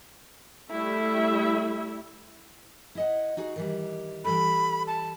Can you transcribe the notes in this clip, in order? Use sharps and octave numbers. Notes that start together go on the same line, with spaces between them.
G3 A3 E4 E5
E4 D#5 F#5
D#4 F#4 G#4
D#3 E3 G3
E3 G3 A4 B5
A5